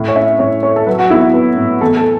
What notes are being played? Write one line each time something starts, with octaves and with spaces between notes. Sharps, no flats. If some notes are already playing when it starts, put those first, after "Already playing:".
Already playing: A2
C#5
C#4 E5
A2 C#5
A3 C#5
A4
F#3 B4
F#4
B3 E4
F#4
B3 B4
A2
E2 A4
A4